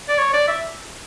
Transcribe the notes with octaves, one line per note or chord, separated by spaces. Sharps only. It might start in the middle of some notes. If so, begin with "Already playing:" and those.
D5
C#5
D5
E5